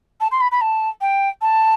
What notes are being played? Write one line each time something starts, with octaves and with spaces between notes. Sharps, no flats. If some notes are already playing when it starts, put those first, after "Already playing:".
A5
C6
B5
B5
A5
G5
A5